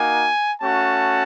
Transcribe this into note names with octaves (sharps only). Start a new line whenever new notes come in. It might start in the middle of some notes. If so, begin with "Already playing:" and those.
Already playing: A#3 D#4 F#4 G#5
A3 C#4 F#4 A5